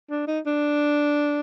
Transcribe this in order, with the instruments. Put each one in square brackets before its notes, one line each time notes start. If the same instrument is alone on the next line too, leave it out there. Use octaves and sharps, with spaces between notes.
[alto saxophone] D4
D#4
D4